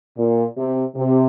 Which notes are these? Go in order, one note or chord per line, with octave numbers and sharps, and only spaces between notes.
A#2
C3
C3